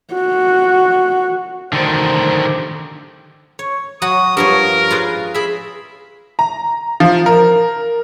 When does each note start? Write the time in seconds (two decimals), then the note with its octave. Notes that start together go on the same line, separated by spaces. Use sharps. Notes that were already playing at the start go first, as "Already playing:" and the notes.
0.14 F#4
1.73 D2 D3 D#3 C5
2.42 G4
3.59 C#5
4.02 F#3 F#4 F#5 D#6
4.37 G2 F3 A#4 C#5
4.90 F4 G#4 B4
5.34 G#4 E5 B5
6.39 A#5
7.00 F3
7.26 A#4